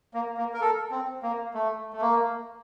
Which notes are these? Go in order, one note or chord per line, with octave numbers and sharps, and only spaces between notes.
A#3
A#3
A#4
A4
C4
A#3
A3
A3
A#3